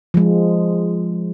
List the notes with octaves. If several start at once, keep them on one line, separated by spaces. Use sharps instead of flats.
F3 G#3